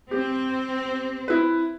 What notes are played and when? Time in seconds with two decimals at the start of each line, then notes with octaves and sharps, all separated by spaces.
0.11 C4 G4
1.28 E4 B4